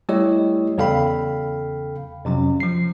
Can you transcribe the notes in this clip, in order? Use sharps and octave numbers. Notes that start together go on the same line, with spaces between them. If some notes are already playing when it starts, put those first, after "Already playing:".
G3 A3 E4 G4 C#5 D#5
E2 C#3 A4 F5 G5 B5
F2 C3 F#3 C#4
F3 C7